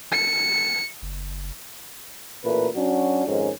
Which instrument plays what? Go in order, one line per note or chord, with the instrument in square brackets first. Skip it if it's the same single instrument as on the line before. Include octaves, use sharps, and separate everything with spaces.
[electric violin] C#7
[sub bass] F#1
[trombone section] A1 A#2 A3 A#4 B4
F#3 C#4 D4 F#4
F2 G#2 D#3 C#4